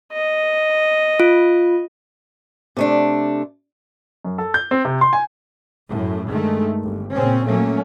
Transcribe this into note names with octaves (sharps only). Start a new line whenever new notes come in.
D#5
F4
C3 A3 D4
F#2
A4
G6
C4
C3
C6
G#5
F#2 A2
G2 D#3 G#3 A3
G1
A#2 C#3 C4 C#4
A#2 F#3 A3 A#3 C#4